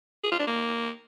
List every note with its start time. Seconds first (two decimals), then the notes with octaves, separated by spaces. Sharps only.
0.24 G#4
0.31 F4
0.39 D4
0.47 A#3